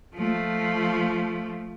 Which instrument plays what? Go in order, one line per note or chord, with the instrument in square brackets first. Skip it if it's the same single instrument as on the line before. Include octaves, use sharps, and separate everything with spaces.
[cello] F3 A3